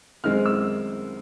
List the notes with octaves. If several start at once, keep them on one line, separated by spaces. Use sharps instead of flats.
F#2 D#3 G#3 C4 F6
E6